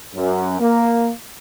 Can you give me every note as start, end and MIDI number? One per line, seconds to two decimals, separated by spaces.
0.15 0.58 42
0.60 1.09 58